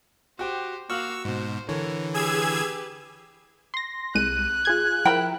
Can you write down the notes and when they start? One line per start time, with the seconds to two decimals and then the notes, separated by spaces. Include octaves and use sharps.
0.39 F#4 G4 C5 G5
0.90 A#3 F#4 F5 C#6 E6 F6 F#7
1.25 G#2 B2 C5
1.69 D3 E3 A4 A#4 C#5
2.14 G4 G#4 B4 E6 G#6
3.74 C6 A#6
4.15 C2 G#3 F#6 D#7
4.65 F4 G#4 G#6
5.05 F3 E4 A#4 G5 B5